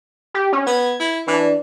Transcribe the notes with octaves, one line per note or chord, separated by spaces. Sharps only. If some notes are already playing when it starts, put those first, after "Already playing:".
G4
C#4
B3 G#6
E4
E3 D4